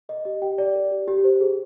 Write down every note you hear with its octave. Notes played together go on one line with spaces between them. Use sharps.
A#4 D#5
G4 D#5
G4 G5
D5
A#4
G4
G4
C5
G#4